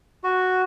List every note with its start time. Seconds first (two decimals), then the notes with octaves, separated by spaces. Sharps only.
0.24 F#4